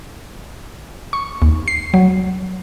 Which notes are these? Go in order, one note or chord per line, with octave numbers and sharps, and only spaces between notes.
C#6
D#2
C7
F#3